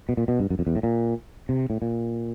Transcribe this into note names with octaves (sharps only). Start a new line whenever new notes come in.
B2
A#2
B2
G2
F#2
F2
E2
A2
A#2
C3
A2
A#2